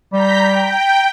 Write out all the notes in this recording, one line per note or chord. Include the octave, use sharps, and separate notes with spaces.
G3 A#5 G6 B6
G5